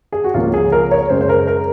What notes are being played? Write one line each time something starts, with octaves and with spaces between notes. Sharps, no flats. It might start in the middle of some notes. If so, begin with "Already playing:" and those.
G#4
F#4
C#2 C#3 F3 A#3 C#4 F4
G#4
A#4
C#5
F#2 C#3 G#3 C#4 C5
C5
A#4
A#4